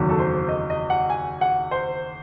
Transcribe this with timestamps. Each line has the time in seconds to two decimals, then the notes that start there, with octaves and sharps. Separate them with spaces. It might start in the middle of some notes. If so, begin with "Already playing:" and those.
Already playing: F#1 E2 D#3 F#3
0.09 A4
0.18 C5
0.49 D#5
0.70 D#5
0.90 F#5
1.10 G#5
1.41 F#5
1.71 C5